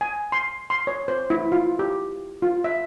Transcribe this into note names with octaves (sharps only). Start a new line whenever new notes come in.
G#5
C6
C6
C#5
C5
E4
F4
G4
F4
E5